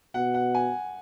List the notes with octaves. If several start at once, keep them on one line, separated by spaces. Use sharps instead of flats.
B2 F#5
F#5
G#5